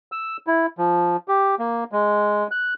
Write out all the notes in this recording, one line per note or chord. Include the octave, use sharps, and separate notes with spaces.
E6
E4
F3
G4
A#3
G#3
F#6